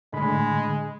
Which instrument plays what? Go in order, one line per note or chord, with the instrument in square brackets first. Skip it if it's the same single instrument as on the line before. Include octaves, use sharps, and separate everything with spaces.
[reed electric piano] A2 D3 B5 [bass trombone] G#3